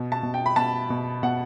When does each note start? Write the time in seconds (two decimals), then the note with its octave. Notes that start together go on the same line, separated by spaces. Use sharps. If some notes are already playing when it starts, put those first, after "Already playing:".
Already playing: B2
0.12 A5
0.23 B2
0.34 G5
0.46 B5
0.56 B2 A5
0.90 B2
1.23 B2 F#5